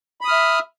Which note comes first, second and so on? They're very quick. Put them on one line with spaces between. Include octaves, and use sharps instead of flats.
B5 D#6 F6 E5